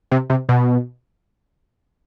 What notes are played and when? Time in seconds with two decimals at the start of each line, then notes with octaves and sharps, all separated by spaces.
0.12 C3
0.30 C3
0.49 B2